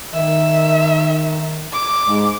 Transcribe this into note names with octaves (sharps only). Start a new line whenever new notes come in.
D#3 E5
D6
G#2